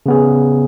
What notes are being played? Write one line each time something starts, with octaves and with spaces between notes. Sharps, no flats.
C#3 B3 G#4